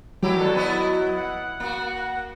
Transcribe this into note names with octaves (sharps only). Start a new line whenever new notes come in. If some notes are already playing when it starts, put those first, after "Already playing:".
D#3 F#3 E4 G4
B2 G3 A4
B3 E4 D#5
F#5
A#3 F#4